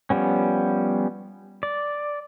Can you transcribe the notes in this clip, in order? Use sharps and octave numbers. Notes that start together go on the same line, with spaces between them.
F3 G3 B3 C#4
D5